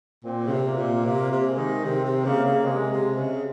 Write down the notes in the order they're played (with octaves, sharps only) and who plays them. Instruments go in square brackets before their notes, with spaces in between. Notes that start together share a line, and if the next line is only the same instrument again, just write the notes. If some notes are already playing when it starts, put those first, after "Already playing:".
[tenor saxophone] A#2 [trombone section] C4
[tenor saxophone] C#3
C3
[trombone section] A#3
[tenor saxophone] A#2
[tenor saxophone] C3 [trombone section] A#3
[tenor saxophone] C3
[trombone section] G#3
[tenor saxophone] D#3
[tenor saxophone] C3 [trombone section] C4
[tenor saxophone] C3
[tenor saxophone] C#3 [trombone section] A#3
[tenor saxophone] C#3
[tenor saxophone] C3 [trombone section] G#3
[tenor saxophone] C3
C#3